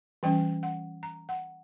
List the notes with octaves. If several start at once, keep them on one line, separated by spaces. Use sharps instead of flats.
E3 G3 C#4 G5
F#5
A#5
F#5